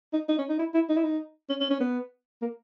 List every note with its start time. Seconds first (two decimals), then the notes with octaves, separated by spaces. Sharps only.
0.13 D#4
0.29 D#4
0.38 C#4
0.49 D#4
0.59 E4
0.74 E4
0.89 D#4
0.97 E4
1.04 D#4
1.49 C#4
1.60 C#4
1.71 C#4
1.80 B3
2.42 A#3